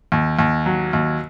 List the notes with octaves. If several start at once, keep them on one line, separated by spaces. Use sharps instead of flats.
D#2
D#2
F#3
D#2